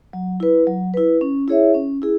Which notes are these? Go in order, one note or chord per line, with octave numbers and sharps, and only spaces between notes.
F#3
E4 B4
F#3
E4 B4
C#4
E4 G#4 C#5 E5
C#4
E4 G#4